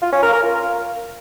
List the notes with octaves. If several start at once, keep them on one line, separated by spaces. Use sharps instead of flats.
F4
C#4
A#4
A#4
F4